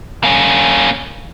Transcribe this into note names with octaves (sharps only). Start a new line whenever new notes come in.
A#3 C#4